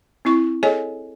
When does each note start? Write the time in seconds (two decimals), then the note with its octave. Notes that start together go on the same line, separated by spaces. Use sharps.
0.25 C4 E4 C#6
0.63 G#4 A4 C#5 D#5 G#5